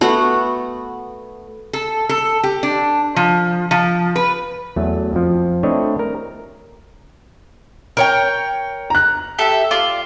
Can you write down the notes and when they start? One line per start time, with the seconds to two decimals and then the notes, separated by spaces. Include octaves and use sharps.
0.01 A3 B3 F#4
1.73 A4
2.09 A4
2.43 G4
2.63 D4
3.16 F3
3.71 F3
4.16 B4
4.76 E2 F#3 A3
5.13 F2 F3
5.63 A3 C4 D4 E4 C#5 D#5
5.99 A#4
7.97 A#4 C#5 G5
8.90 A#5 F#6
9.38 G4 A4 E5
9.71 F4 D5